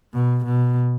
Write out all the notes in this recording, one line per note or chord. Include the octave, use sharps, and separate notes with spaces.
B2
B2